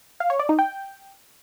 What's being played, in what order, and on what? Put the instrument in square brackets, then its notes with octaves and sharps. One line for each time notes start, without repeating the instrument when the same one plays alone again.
[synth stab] F5
C#5
D5
D#4
G5